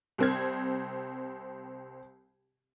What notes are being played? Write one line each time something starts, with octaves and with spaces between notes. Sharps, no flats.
C2 C4 G#6